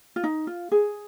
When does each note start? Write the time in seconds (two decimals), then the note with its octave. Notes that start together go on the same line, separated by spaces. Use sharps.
0.16 F4
0.24 D#4
0.47 F4
0.72 G#4